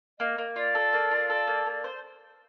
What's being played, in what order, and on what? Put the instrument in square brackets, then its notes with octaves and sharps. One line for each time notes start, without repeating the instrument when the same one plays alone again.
[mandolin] A#3 [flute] D#5
[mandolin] A#3
[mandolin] F4 [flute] D5
[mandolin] A4
A#3
F4
A4
A#3
A#3
C5